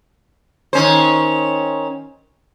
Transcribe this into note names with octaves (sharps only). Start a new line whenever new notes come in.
D#3 C#4 C5